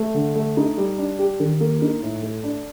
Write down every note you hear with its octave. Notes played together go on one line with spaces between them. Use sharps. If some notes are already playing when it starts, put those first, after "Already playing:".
Already playing: A3
D3
A3
D#4
G3
D4
G4
D#3
A#3
D#4
A2
A3
D4